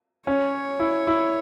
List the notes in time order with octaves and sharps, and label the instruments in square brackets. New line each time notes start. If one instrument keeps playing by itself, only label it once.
[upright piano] C#4 [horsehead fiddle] C#5
[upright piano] E4
E4